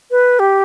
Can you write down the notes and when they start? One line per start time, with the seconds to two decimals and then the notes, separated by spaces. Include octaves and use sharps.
0.11 B4
0.39 G4